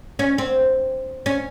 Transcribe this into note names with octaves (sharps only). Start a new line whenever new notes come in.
C#4
C4
C#4